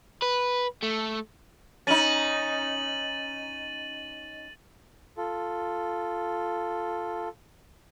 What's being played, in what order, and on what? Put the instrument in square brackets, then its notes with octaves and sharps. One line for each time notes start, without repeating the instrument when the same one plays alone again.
[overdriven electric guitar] B4
A3
[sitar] C#4 D#4 [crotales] A6 D#7 F#7
[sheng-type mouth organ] F4 A4